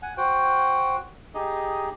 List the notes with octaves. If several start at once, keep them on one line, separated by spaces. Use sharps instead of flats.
F#5 G#5
F#4 C5 F#5 G5
D#4 G4 G#4 D#5